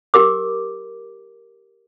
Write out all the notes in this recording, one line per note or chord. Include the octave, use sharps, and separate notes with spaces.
G4 A#4 D6